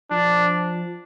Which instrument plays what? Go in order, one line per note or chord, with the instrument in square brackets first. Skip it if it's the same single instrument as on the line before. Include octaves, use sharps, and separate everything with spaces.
[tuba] F3 [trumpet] D4